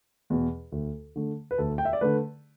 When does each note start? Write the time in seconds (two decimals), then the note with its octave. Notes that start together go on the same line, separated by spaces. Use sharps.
0.30 E2 B2
0.72 D2
1.16 D3 A3
1.51 B4
1.58 D2 A4
1.78 G5
1.85 E5
1.93 D5
2.01 D3 A3 B4